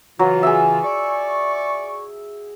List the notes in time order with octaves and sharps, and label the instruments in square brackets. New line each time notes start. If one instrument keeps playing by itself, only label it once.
[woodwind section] C#3 E3 F4 [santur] F#3
[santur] G#4 E5
[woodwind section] D5 C#6